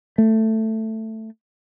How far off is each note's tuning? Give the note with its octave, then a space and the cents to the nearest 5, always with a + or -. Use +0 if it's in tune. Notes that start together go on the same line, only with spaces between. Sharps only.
A3 +10